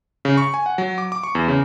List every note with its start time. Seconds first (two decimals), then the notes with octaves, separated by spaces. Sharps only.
0.25 C#3
0.37 C#6
0.54 G#5
0.66 F#5
0.78 F#3
0.98 D6
1.12 D6
1.24 C#6
1.35 E2
1.48 C#3